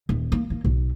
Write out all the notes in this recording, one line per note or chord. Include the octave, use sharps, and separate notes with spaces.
D#1
A#3
A#3
B1